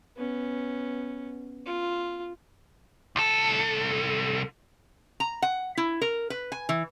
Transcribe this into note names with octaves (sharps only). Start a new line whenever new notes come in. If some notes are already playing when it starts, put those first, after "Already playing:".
B3 C#4
F4
C2 A4
A#5
F#5
E4
A#4
B4
G#5
E3